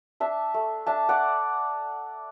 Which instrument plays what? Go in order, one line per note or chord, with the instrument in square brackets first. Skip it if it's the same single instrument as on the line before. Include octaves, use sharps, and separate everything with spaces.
[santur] D4 E5 A5
A3
D4 E5 A5
D5 F#5